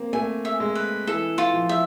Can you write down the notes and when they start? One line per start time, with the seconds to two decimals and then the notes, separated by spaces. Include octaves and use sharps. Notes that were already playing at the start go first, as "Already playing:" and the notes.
Already playing: A#3 C4
0.13 A3 G#5
0.45 E5
0.60 G#3
0.75 B4
1.07 E3 A4
1.38 F4
1.54 F3
1.69 E5